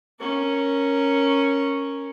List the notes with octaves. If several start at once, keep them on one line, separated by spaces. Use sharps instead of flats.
C#4 A#4